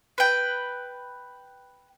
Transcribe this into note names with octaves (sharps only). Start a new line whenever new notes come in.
B4 G5